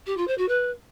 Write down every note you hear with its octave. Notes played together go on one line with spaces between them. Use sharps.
G4
F4
C5
F#4
B4